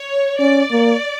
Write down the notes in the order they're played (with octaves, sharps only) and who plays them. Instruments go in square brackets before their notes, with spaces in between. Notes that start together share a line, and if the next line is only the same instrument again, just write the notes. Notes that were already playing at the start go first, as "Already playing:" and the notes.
Already playing: [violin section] C#5
[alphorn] C#4 [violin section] D5
[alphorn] A#3